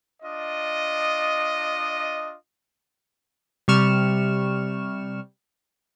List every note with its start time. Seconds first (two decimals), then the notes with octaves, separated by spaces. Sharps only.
0.23 D4 F4 D#5
3.68 C3 G3 C#6 F6 E7